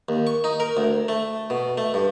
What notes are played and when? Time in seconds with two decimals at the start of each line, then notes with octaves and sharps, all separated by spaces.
0.09 D#2
0.27 C#6
0.44 D#4
0.60 A#4
0.77 D2
1.08 A3
1.50 B2
1.78 A3
1.94 G2